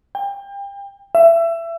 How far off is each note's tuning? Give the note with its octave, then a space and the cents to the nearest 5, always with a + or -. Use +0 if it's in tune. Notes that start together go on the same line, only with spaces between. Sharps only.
G5 +30
E5 +25